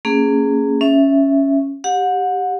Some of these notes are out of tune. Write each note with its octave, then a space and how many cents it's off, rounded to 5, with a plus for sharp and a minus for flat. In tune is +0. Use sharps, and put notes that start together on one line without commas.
A#3 -30 C#4 +0 G#4 +0
C#4 +0 E5 +0
G4 +0 F#5 -30